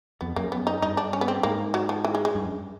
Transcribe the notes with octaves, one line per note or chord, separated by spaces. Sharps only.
F2 B3
F#2 A#3
B3
D#4
G2 D#4
D4
C#4
B3
C4
G#2 A#3
F#3
F3
E3
G#3
G#3
G2
F#2